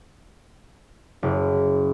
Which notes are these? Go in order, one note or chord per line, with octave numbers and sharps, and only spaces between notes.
F#1